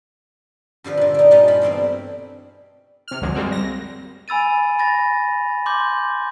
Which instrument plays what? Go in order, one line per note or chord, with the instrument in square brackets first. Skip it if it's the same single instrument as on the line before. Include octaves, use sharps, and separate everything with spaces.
[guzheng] G2 D3 F3 B4
A#2 D3
D4 D#4
A#2 G3 A3 C#4 D#4 F4
G2 F4 B5
B2 E3 C4 D4
[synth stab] C3 F6
C#2 F#2 D3 F3 F#3 G#3
G3 G#3 A#3 C4 F#4
A#6
[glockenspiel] G#5 B5 E6 A6 D#7
B5 A6 A#6
C6 D6 G6